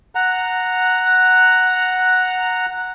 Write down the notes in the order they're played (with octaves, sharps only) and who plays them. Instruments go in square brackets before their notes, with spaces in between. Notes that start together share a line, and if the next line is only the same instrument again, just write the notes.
[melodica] F#5 A#5